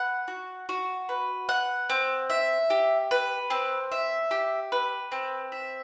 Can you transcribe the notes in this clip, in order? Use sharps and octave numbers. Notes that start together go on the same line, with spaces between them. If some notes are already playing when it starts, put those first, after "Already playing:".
Already playing: B4 F#5
F#4
F#4
B4
F#5
C4
E5
G4
B4
C4
E5
G4
B4
C4
E5